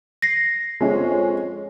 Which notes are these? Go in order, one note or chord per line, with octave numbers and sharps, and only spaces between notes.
A#6 C7
F2 G#3 C#4